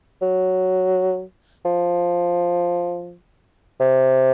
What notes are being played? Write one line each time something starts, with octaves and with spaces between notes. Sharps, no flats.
F#3
F3
C3